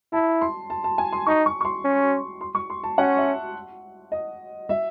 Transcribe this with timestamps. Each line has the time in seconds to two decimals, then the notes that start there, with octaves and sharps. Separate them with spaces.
0.13 E4 A5
0.41 C6
0.70 A5
0.84 A5
0.98 G#5
1.12 C6
1.26 D#4 C#6
1.46 C#6
1.61 C#6
1.65 C6
1.85 C#4
2.41 C6
2.55 C#6
2.70 C6
2.83 A5
2.98 C#4 F#5
3.17 E5
4.12 D#5
4.69 E5